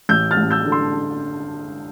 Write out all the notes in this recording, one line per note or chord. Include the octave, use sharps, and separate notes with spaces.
A1 E6 G6
F6 A6
A1
E6 G6
D3
C6 E6